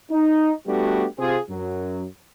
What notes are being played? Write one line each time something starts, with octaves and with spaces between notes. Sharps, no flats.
D#4
G3 A3 B3 D4 F#4 G4
C3 C4 F4 G#4
F#2 F#3